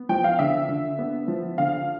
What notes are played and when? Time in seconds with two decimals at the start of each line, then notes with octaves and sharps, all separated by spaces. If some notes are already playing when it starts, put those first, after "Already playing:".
Already playing: B3
0.09 F3 G5
0.24 F5
0.39 D3 E5
0.69 D3
0.98 B3
1.28 F3
1.58 D3 F5